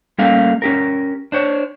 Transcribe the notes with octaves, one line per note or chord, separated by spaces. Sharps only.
G3 A3 A#3 C#4 F5
C#4 G4 A#4
D4 C5 C#5